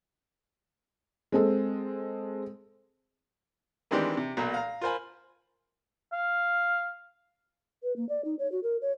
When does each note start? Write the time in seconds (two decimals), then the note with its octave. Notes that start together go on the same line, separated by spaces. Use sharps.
1.32 G#3 C4 A4
3.91 D#3 E3 G#3 C4 D4 G4
4.17 C3
4.37 B1 A#2 F#4 A#5
4.54 F5 A#5
4.81 F4 A#4 C5 G#5 B5
6.13 F5
7.83 B4
7.96 A#3
8.09 D5
8.25 D#4
8.39 C#5
8.52 F#4
8.63 A#4
8.82 C#5